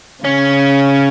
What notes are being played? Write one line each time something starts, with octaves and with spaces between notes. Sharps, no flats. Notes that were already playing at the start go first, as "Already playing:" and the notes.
C#3 C#4